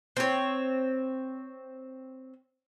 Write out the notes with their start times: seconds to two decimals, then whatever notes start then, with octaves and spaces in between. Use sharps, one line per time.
0.17 C4 C#5